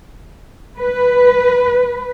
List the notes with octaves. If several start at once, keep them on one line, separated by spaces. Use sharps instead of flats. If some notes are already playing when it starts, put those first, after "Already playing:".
B4